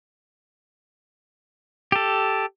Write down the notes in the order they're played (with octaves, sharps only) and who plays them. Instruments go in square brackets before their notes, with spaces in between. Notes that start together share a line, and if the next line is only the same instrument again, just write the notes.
[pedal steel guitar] G4 A4